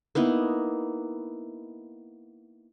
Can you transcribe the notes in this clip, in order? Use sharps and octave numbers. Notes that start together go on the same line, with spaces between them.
A#3 B3 D#4 E4